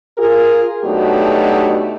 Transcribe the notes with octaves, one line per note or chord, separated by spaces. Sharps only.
F4 G#4 A#4
B2 F#3 A3 D4 D#4 G4